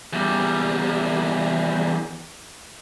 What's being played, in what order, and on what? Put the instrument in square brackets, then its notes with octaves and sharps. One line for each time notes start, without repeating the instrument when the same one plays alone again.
[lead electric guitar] E2 G3